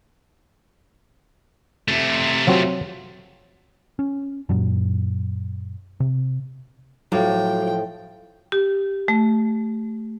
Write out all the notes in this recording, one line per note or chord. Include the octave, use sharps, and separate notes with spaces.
C3 A3
F3 F#3 C4
C#4
F#2 A#2 F#3
C3
A2 F3 F#3 F5 G5 D6
G4
A3